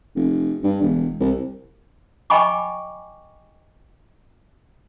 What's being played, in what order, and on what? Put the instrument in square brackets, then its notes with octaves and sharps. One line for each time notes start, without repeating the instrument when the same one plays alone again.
[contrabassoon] F1
G2
E1
C2
[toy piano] D#5 G5 G#5 B5 C#6 D6